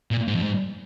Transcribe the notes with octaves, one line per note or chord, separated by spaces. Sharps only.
A#2
G#2
F2
G#2